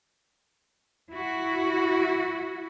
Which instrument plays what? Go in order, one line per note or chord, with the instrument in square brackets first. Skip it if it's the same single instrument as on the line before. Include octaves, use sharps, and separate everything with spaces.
[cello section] E4 F#4